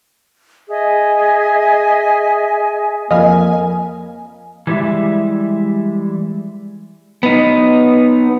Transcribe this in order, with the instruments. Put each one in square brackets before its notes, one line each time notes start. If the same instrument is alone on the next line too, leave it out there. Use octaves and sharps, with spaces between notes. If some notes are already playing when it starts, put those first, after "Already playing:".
[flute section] G#4 D#5 E5 G#5
[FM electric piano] F2 [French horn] A#3 [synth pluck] D#5 F5 B5 [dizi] G#5
[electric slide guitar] E3 G3 G#3 G4 E5
[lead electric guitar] B3 D#4